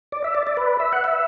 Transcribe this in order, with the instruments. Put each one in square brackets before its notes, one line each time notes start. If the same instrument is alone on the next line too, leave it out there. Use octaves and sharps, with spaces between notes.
[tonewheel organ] D5
E5
D5
D5
B4
E5
F#5
E5